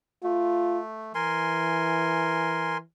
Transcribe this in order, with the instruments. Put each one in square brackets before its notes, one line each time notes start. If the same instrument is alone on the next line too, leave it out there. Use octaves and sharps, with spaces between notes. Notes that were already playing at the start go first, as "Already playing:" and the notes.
[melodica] A3 [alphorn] F4
[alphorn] E3 [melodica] A#4 G#5 C6